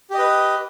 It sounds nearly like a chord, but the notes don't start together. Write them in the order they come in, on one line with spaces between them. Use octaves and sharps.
G4 D#5 B4